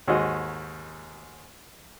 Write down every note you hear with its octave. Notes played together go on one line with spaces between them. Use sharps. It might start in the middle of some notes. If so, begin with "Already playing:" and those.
D#2 G#2 F#4 D#5